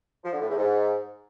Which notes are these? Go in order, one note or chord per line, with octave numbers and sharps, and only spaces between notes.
F3
D3
A2
E2
G#2